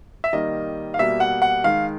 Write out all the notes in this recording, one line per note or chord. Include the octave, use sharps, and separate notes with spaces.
E5
D#3 G3 A#3 D#5
F5
B2 G3 A#3 E5
F#5
F#5
D#3 G#3 F5